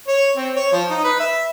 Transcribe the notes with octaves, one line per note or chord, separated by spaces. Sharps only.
C#5
C4
C#5
F3
D#4
B4
E5